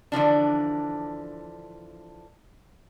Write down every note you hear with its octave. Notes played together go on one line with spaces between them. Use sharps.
D3 E3 F3 D4